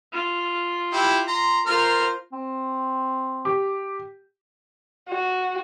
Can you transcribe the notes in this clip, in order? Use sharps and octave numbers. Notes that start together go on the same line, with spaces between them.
F4
E4 G4 B5
A#5 C6
F4 A#4 C5 F6
C4
G4
F#4